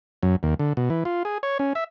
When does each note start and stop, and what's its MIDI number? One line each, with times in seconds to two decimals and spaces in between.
0.23 0.36 42
0.43 0.54 39
0.59 0.73 50
0.77 0.89 47
0.90 1.04 52
1.05 1.23 65
1.25 1.38 68
1.43 1.58 73
1.59 1.73 61
1.75 1.84 76